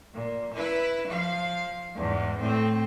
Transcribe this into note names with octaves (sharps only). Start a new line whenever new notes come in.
A#2
E4 B4
F3 F5
E2 G#2
A2 C4